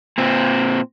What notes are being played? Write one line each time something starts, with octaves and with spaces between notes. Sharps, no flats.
A#2 C4